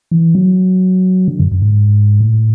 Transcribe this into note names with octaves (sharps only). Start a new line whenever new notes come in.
E3
F#3
D3
F#2
F#2
G#2
A2